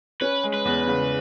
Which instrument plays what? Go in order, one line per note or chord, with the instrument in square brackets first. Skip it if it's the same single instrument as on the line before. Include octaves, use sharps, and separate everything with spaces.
[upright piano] C#4 [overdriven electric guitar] B4
[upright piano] G#3
[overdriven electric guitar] B4
[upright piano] E2
C#3